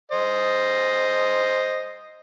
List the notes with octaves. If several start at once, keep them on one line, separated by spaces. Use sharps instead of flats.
C5 D#5